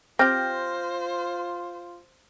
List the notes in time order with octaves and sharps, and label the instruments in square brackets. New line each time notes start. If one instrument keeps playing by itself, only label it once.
[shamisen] C4 G4 [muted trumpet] F4 [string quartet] C5 [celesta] F6 G6 A#6